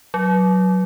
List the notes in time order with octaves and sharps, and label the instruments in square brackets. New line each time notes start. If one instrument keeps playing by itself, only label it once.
[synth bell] F#3